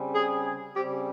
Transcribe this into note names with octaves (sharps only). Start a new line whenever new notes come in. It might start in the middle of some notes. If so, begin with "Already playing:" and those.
Already playing: C#3 G3 C4
G#4
G#4
C#3 G3 C4 G4